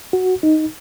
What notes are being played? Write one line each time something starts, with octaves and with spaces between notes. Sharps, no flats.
F#4
D#4